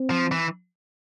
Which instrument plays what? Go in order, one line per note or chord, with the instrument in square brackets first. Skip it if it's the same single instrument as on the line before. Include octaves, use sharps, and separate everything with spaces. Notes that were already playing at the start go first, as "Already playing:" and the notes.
Already playing: [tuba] C4
[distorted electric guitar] F3
E3